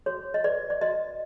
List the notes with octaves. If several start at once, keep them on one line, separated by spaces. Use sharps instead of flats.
F#4 C#5
D#5
B4 D5
D5
F#4 D#5